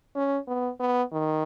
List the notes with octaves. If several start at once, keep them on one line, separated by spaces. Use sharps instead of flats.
C#4
B3
B3
D#3